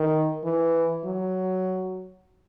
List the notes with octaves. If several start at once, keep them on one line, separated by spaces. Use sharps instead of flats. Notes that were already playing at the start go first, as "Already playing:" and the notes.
Already playing: D#3
E3
F#3